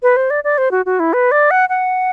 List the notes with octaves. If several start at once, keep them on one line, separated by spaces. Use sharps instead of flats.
B4
C5
D5
D5
C5
F#4
F#4
E4
B4
D5
F#5
F#5